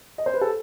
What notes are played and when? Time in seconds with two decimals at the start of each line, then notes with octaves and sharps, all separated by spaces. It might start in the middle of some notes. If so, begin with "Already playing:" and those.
0.18 D#5
0.26 C5
0.34 B4
0.41 A4